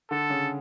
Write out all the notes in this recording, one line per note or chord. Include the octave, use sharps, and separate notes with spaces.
D3 A4
C#3